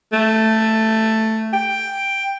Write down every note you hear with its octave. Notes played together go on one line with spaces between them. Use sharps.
A3
G5